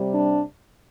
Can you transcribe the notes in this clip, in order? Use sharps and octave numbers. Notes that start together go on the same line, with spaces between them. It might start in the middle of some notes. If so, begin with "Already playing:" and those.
Already playing: C3 G3
D4